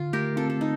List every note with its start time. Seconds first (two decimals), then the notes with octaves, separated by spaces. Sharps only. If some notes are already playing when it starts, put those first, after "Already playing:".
Already playing: D3 F4
0.13 A3 G4 A#4
0.37 C4 F4 A4
0.50 A4
0.61 D#4